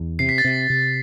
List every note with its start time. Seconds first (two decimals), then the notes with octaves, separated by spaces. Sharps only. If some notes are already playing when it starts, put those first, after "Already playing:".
Already playing: E2
0.19 C3 C7
0.29 B6
0.38 A6
0.44 C3 B6
0.70 C3